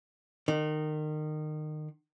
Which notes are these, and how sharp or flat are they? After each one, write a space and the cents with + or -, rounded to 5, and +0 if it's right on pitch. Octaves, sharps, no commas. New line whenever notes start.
D#3 -25